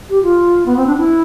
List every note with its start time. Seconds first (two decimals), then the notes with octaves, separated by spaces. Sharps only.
0.10 G4
0.23 F4
0.66 B3
0.77 C4
0.87 D4
0.97 E4